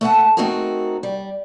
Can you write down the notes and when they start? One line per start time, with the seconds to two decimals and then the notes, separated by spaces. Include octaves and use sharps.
0.01 A3 A4 B4 F5 F#5 A5
0.37 A3 C4 D#4 F#4 G#4 A#4
1.03 G3